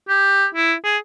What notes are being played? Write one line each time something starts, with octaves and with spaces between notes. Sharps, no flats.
G4
E4
G#4